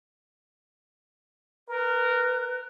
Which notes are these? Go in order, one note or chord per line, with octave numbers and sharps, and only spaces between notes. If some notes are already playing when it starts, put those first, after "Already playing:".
A#4 B4